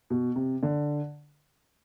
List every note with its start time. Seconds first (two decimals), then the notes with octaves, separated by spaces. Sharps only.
0.10 B2
0.36 C3
0.62 D3